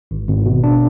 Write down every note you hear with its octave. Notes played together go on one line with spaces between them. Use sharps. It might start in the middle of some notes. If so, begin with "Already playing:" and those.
G#1
G#1
B2
D4